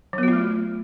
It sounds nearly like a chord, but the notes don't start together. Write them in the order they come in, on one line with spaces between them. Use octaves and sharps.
F#3 B3 F#4 F4 A3